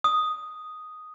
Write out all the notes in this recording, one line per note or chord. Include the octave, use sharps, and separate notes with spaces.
D#6